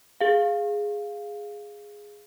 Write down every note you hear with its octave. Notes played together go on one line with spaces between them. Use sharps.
G#4 F5